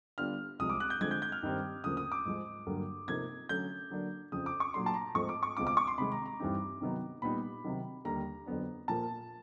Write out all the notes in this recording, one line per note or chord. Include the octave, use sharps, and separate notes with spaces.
D3 G3 B3 D4 F4 F6
C2 C3 F3 G#3 D#6
D6
F#6
G6
D3 F3 G#3 C4 G#6
G6
G6
F6
G2 D#3 G3 C4
D2 C#3 F3 A#3 D#6
D#6
D6
G#2 F3 G#3
G2 D3 F#3 A#3
C3 F3 A#3 D#4 G#6
D3 F#3 A3 C#4 G6
D3 F#3 A#3 D4
F2 C#3 F3 D#6
D6
C#6
A#2 F#3 A3 D4 C6
A5
A#5
G#2 F3 A3 C4 C#6
D6
C#6
C#2 B2 G#3 C4 F4 D6
D6
C#6
C6
C3 D#3 G#3 B5
A#5
A#5
G2 E3 G3 C4 D#4
C3 D#3 F#3 B3 D#4
A#2 G3 B3 D#4 B5
C3 D#3 F#3
D#2 D3 G3 A#3 A#5
F2 D3 F#3 B3 D4
A#2 F3 A#3 A5